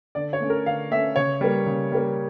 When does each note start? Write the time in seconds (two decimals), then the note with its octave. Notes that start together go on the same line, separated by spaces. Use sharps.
0.15 D3 D5
0.33 C#5
0.40 A3 C#4
0.50 A#4
0.66 D3 F5
0.91 A3 C#4 E5
1.16 C#3 C#5
1.41 G3 A#3
1.66 C#3
1.92 G3 A#3